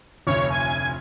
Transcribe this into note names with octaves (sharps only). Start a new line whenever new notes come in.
F1 D2 C#5
G#5 G#6